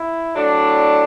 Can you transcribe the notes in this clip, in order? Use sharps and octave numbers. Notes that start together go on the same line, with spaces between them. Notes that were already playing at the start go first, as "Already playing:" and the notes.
Already playing: E4
A2 F#3 D4